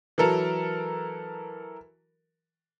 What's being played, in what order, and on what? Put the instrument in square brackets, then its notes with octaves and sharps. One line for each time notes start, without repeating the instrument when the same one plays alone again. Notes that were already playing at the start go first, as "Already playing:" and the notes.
[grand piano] E3 F#3 A4 A#4